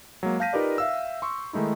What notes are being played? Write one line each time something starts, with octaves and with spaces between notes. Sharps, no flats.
F#3 G#3 A#3
F5 A5 G6 A#6 B6 D#7
D#4 F4 G4 A#4 B4 D5
E5 F5 E6
C6 C#6 E6
D#3 G#3 A3 D#4 E4